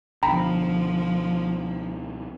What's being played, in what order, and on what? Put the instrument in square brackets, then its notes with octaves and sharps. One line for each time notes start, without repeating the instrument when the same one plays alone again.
[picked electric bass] C#2 B2 D3 [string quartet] F3 [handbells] G5 A#5 B5